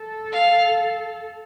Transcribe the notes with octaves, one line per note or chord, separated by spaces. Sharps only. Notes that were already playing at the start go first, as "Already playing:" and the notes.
Already playing: A4
F5